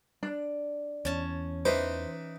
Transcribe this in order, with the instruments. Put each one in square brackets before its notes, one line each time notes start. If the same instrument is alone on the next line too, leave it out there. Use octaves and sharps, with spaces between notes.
[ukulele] D4
[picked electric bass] E2 [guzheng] C#4 A5
[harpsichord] E3 B4 D6 [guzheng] D#4 [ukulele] C5